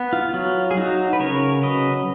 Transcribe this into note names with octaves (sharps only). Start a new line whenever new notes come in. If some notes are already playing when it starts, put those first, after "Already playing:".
Already playing: B3
F4
F#3 F4
G#4
F#3 D#4 F#4
B4
C#3 A#4 C#5
F#3 B4 D#5